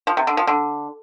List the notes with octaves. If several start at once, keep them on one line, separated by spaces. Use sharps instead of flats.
F3
C3
D3
F3
D3